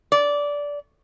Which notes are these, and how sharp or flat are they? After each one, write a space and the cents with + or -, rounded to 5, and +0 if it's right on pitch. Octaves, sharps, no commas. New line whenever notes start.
D5 -15